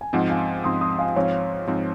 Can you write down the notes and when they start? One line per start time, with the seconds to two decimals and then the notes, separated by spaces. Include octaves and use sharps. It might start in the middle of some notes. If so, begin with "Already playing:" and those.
0.01 G#5
0.13 G#2 F3 C4 D#5 F#5
0.30 F5 G#5
0.64 G#2 F3 C4 C6 D#6
0.81 C6 D#6
0.99 F5 G#5
1.16 G#2 F3 C4 C#5 F5
1.68 G#2 F3 C4